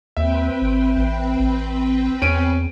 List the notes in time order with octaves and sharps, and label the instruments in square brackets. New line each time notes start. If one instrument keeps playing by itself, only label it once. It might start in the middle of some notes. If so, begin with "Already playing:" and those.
[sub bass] D#2 [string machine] C4 B4 G5 [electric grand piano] E5
[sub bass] G#1
A1
A1
[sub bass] E2 [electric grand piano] C#4 D7 D#7